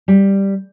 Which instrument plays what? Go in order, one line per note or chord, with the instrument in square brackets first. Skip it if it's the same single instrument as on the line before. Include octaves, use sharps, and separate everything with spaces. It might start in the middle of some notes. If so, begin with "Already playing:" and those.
[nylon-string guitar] G3